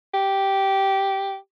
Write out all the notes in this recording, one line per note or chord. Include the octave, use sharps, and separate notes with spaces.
G4